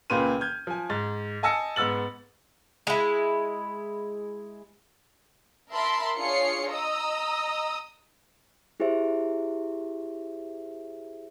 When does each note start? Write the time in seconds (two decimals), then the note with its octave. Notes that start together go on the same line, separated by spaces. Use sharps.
0.10 C#2 A#2 F4 B4 C6 D#7
0.40 F6 G6 G#6
0.67 F3 G#5
0.90 G#2 A6
1.43 D#5 G#5 A5 E6 A#6 C#7
1.76 G#2 B3 E6 A6 F#7
2.87 G#3 E4
5.73 A#4 E5 A5 B5 C6
6.17 D4 F4 G#4 C#5 C7 C#7
6.71 D#5 A#5 D#6 E6
8.80 E4 G4 G#4 C5 E5